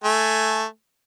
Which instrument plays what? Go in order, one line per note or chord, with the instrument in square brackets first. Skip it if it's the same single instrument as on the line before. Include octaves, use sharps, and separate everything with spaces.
[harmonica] A3 G#5